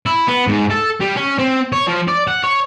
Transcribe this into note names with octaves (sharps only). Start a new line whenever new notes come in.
E4
B3
G#2
A4
G3
C#4
C4
C#5
F3
D5
F#5
C#5